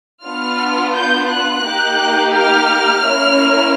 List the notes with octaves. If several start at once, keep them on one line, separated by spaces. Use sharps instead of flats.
B3 D4 F4 F6
G6
F#6
A#3 D#4 G4
F6
A#3 C#4 E4